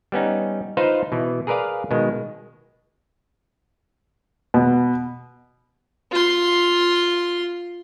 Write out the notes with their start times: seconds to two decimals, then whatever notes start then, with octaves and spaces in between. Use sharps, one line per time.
0.12 G3 B3 C#4 D#4
0.77 D#4 F4 B4 C5 F5
1.12 B2 E3
1.47 G#4 A#4 B4 D5 F5
1.91 B2 D#3 G#3
4.54 B2
6.11 F4 C6